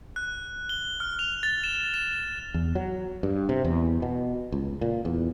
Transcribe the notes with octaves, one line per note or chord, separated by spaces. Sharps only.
F#6
G7
F6
F7
A6
E7
E7
E2
F#3
G2
C3
E2
B2
C#2
A#2
E2